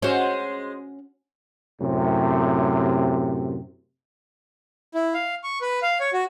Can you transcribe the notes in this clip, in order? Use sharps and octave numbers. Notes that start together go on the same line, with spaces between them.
G#3 C#4 F#4 C5
F#2 A2 C3
E4
F5
C#6
B4
F5
C#5
F#4